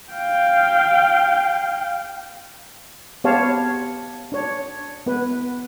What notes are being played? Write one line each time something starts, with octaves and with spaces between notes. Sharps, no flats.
F5 G5
B3 G4 C5 C#5 F5 A5
D4 C#5
B3 B4